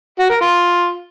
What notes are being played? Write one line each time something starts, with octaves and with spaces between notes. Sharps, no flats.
F#4
A#4
F4